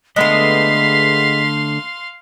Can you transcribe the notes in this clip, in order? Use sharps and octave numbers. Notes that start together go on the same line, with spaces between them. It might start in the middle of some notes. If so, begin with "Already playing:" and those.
D3 G#3 A3 B3 D#5 F5 C6 B6